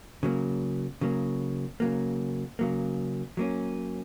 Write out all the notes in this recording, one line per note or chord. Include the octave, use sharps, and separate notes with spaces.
C#3 F#3 A#3
C#3 F#3 A#3
C#3 F#3 A#3
C#3 F#3 A#3
F#3 A#3 C#4